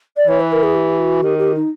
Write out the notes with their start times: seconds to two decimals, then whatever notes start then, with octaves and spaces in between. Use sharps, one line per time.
0.16 D5
0.27 E3 C#5
0.40 B4
0.52 A#4
0.63 G#4
0.74 G4
0.98 F#4
1.23 D#3 G4
1.38 G4
1.54 D#4